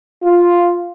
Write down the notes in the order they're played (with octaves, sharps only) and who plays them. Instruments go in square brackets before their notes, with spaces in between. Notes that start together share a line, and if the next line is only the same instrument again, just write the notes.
[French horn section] F4